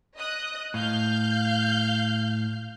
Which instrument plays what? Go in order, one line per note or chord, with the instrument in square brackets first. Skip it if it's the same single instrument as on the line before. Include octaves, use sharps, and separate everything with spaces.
[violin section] D#5 D#6 F#6
[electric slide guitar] A2 [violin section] F5 F6 G6